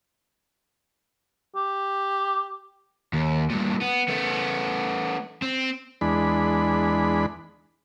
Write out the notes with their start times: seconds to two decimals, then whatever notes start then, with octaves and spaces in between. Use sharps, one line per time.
1.56 G4
3.13 D#2
3.50 G2 A#2
3.81 B3
4.08 A3 B3
5.42 C4
6.01 E2 G#3 D4 B5